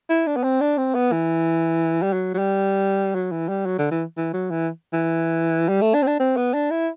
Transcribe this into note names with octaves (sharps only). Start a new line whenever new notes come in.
E4
D4
B3
C4
D4
C4
B3
E3
G3
F#3
F#3
G3
F#3
E3
G3
F#3
D3
E3
E3
F#3
E3
E3
G3
A3
D4
C4
D4
C4
B3
D4
E4